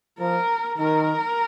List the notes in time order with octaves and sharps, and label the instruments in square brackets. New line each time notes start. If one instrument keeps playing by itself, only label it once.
[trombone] F3 [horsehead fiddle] A#4
[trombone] D#3 [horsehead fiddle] A#4